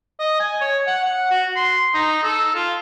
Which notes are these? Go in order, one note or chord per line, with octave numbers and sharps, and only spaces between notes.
D#5
G#5
C#5
F#5
F#5
F#4
C6
D#4
A4
F4